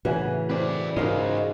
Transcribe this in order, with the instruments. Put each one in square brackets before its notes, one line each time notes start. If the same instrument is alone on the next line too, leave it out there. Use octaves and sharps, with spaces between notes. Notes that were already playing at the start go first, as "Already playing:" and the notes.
[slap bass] A2 [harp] C#3 E3 F#4 [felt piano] B4 F#5 G#5
[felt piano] C4 [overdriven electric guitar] B4 D5
[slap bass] G#2 [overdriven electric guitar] C#3 G#3 [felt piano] D#4 A#4 [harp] F4 F#4